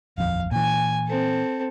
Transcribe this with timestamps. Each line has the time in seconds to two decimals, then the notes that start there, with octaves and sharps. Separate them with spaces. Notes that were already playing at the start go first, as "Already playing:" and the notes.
0.18 D#1 A#1 F2 F5
0.51 A#2 E3 G#5
1.07 C4 A4